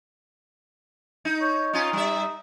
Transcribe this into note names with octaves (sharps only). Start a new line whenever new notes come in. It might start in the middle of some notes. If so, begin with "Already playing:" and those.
D#4
C#5
C#4 D#4 F4
G3 E5